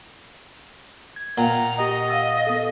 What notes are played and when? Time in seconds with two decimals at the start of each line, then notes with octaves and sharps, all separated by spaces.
1.16 G#6
1.38 A#2 F#5 G5 A#5
1.77 G4 D#5 F#5 G5
2.08 F5 E6 A6
2.47 B3 A4